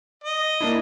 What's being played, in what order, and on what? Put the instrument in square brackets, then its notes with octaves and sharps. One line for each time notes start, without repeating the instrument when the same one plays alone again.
[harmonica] D#5
[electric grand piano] A#3 D4 E4